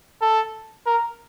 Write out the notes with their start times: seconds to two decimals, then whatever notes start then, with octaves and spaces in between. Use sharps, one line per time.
0.22 A4
0.86 A#4